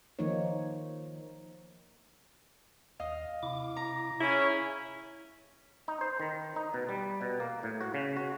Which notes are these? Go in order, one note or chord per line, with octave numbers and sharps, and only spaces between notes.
D#3 F3 A#3 D#4 C#5
D#2 D#5 F5
C3 E4 D6
A#5
C#3 C#4 E4
D#4
C5
D#3
D#4
B2
G3
B2
A#3
A2
F#4
C#3
F#4